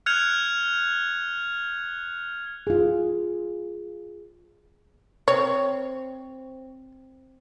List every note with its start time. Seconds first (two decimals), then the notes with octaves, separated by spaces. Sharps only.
0.06 F6 F#6 G#6 C#7 F7
2.67 F4 G#4
5.28 C4 C#5